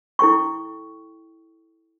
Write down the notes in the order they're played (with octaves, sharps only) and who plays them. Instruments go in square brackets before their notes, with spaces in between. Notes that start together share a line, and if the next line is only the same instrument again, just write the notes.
[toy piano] E4 A4 G5 C#6